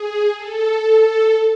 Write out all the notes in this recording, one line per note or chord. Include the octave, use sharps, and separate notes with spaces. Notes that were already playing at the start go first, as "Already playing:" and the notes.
Already playing: G#4
A4